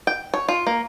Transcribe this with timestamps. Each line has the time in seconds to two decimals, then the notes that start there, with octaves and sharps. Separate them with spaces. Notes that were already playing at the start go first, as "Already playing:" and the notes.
0.07 G5
0.34 C#5
0.48 F4
0.67 A#3